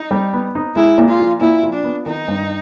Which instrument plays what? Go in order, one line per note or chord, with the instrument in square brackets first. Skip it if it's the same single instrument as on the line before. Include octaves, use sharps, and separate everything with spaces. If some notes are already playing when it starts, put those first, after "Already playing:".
Already playing: [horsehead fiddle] D#4
[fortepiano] G3
B3
D#4
[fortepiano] G#3 [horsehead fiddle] E4
[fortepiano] A#2
[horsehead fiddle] F4
[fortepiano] F3
[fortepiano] A#2 [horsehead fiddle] E4
[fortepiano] F3
[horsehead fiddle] D4
[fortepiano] B3
[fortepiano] D#3 [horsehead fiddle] D#4
[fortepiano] G2